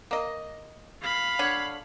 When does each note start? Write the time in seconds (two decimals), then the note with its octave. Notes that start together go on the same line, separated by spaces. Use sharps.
0.11 A#3 D#5
1.01 F5 B5
1.39 D3 C#5